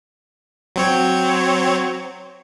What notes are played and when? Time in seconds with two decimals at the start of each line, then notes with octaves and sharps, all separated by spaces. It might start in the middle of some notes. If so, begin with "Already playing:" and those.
0.76 F#3 C4 C#5